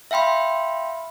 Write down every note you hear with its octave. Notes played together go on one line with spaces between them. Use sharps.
E5 F5 G5 B5 C6